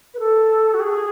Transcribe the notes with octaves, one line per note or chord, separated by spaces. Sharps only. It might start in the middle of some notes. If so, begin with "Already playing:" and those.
B4
A4
F#4
G#4